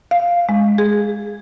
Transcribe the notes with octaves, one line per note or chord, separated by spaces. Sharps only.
F5
G#3
G#4